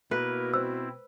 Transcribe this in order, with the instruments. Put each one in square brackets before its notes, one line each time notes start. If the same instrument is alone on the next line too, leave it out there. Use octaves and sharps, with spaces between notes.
[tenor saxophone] B2 [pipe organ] A#3 E4 A#4 [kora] B4
[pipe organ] C4 E4 [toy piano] C5 E6